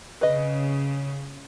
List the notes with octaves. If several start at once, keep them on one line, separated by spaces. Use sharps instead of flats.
C#3 B4 D#5